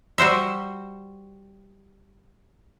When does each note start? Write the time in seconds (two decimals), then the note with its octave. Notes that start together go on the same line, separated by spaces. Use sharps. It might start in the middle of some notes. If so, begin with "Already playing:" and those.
0.18 G3 F#4 C5 E5